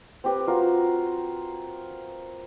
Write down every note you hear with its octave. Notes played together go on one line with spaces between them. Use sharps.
C4 G4 B4
F4 F#4 A#4